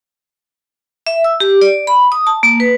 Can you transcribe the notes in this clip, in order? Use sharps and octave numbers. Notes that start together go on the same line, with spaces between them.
E5
E6
G4
D5
B5
D#6
A5
A#3
B4